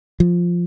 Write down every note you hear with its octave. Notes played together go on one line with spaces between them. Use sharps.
F3